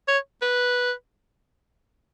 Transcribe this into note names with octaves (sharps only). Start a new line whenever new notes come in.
C#5
B4